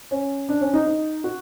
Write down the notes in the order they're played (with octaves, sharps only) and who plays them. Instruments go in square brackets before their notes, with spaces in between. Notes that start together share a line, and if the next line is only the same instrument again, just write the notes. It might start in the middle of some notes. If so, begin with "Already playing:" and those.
[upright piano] C#4
D4
C#4
D#4
D#4
F#4